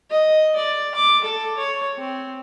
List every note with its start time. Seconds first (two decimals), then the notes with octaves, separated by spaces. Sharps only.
0.11 D#5
0.56 D5
0.95 D6
1.24 A4
1.58 C#5
1.97 C4